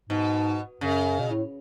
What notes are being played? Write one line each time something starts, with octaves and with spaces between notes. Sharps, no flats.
G#2 B2
F#2 C#3
B2
A2